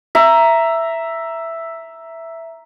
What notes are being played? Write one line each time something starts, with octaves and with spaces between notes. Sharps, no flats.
E5 A#5